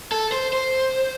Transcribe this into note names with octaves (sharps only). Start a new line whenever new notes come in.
A4
C5
C5